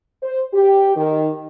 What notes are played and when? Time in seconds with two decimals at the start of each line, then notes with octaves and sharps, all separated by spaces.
0.22 C5
0.53 G4
0.96 D#3